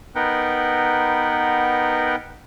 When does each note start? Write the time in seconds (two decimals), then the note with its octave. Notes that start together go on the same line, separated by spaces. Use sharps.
0.15 B3 D#4 A#4 B4 F#5 G5